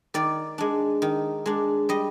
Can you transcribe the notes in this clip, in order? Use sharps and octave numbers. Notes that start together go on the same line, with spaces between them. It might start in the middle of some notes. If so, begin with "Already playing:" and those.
D#3 D5
G#3 D4
D#3
G#3 D4
G3 D#5